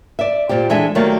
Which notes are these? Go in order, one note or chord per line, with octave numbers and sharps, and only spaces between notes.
D5 E5
A#2 G3 C4 G4
E3 G#3 D4 A4 E5 G#5
D#3 F#3 G3 A3 A#3